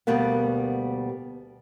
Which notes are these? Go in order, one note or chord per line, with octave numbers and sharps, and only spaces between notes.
D2 B2 G3 A#3 B3